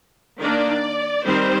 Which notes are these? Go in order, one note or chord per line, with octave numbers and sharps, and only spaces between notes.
D#3 A#3 D4 D5
D#3 G3 C4 C5